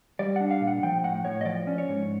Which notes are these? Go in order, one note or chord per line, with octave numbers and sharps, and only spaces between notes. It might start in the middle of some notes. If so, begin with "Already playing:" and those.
G3 D5
D4 F#5
F5
A#2
F#5
F3 G5
A2 F#5
A2 C#5
D#5
F3 D5
C#4
C#5
G#2